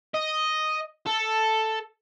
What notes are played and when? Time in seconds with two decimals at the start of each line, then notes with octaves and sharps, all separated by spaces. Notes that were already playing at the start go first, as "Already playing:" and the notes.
0.14 D#5
1.06 A4